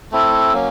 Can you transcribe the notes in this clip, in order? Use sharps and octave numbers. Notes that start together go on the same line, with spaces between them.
A3 C4 E4 A4
F#3 A#3 C#4